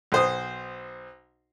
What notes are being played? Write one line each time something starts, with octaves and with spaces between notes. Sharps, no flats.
B1 C5 D#6